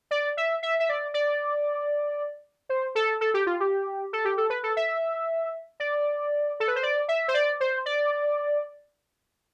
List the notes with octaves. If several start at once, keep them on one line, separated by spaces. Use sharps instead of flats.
D5
E5
E5
E5
D5
D5
C5
A4
A4
G4
F4
G4
A4
G4
A4
B4
A4
E5
D5
A4
B4
C5
D5
E5
C5
D5
C5
D5